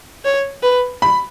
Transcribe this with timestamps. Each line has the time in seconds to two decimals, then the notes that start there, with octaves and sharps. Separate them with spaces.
0.25 C#5
0.63 B4
1.02 B5